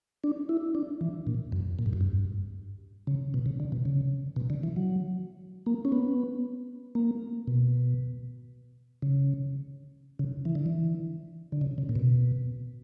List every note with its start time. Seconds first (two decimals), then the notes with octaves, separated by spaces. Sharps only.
0.24 D4
0.49 E4
0.75 D4
1.01 E3
1.27 A#2
1.52 F#2
1.79 A#2
1.86 G2
1.93 F#2
2.01 G2
3.07 C#3
3.34 B2
3.46 C#3
3.60 D3
3.72 B2
3.85 C#3
4.36 B2
4.50 D3
4.63 E3
4.76 F#3
5.66 A#3
5.85 C#4
5.92 B3
6.95 A#3
7.47 B2
9.02 C#3
10.19 C#3
10.45 E3
10.55 D3
10.66 E3
11.52 D3
11.61 C#3
11.78 C#3
11.89 A#2
11.96 B2